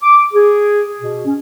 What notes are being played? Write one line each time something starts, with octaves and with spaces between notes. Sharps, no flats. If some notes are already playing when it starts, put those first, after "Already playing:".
D6
G#4
B2
C#4